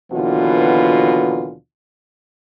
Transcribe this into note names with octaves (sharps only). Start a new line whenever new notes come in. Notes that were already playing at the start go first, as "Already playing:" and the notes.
D#2 B2 D3 E3 F#3 F4